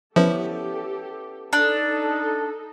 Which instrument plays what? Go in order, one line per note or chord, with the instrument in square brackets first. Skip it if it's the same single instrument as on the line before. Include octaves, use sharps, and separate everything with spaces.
[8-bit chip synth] F3 [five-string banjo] B3 C#4 E4 [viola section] G4 A4
[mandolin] D4 [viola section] D#4 A4